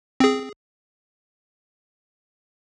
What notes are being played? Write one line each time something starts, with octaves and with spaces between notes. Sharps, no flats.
C4 G#4